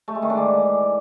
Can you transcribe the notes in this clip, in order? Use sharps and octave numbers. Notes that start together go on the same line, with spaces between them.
A3
G#3
D#3
D4
E3